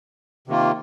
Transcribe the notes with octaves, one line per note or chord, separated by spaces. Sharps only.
C3 D#3 A#3 F4